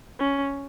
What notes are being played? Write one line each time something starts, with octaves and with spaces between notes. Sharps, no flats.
C#4